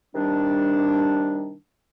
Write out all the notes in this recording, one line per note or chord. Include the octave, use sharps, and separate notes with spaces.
C3 D#3 G3 D4